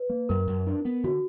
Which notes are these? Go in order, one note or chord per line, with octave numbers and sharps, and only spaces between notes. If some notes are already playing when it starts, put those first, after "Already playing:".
Already playing: B4
A#3
F#2 A#4
F#2
D4
B3
D3 F#4